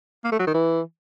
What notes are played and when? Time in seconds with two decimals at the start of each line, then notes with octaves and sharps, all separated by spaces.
0.24 A#3
0.32 A3
0.39 F#3
0.47 D#3
0.54 E3